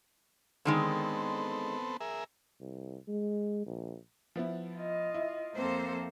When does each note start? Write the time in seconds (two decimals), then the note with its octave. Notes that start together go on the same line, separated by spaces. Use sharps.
0.65 D3 D#3 G#3 B3 C4 A4
2.00 G#4 A#4 E5
2.60 C2
3.08 G#3
3.66 A#1
4.36 F3 B3 E4
4.76 F4 D#5
5.14 E4
5.55 F2 A#3 C4 A4 C5